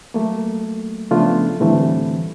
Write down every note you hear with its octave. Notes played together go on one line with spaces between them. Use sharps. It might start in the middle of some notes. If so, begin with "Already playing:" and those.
F#3 A3 A#3
C#3 F3 A3 B3 D4 F4
A2 D3 E3 G3 A3 C4